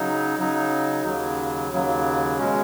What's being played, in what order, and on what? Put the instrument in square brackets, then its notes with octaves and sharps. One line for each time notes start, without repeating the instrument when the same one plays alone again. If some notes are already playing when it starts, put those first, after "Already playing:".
Already playing: [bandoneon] C#3 F#3 D#4
C#3 F#3 D#4
D#2 C#3 F#3
D#2 C#3 F#3
B2 G#3 C#4